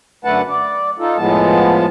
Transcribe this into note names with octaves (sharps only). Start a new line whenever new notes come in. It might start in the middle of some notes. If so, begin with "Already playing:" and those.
F#2 D3 A3 B4 F#5 A5
D5
D#4 F4 A4
A2 F3 G#3 B3 A5